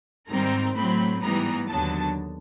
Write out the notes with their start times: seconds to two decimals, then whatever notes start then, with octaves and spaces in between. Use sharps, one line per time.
0.28 G#2 D#3 G3 C4 A#5
0.75 A2 F#3 A3 C4 B5
1.21 G#2 E3 G3 B3 A#5
1.68 D#2 D3 F#3 B3 A5